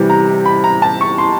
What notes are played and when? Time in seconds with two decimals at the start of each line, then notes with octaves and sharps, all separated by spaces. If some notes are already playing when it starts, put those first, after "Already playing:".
Already playing: C3 E3 G3
0.10 A#5
0.46 B5
0.64 A#5
0.82 A5
1.01 C#6
1.18 C6